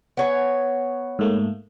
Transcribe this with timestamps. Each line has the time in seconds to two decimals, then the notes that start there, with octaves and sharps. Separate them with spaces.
0.17 B3 C#5 G#5
1.19 G#2 A3 A#3